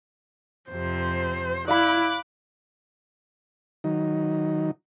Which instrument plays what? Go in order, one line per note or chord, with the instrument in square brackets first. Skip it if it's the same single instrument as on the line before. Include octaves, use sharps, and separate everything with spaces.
[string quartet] F2 C3 [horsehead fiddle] C5
[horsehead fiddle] E4 [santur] D5 F5 B5 [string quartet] D6 F#6
[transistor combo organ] D#3 F#3 D#4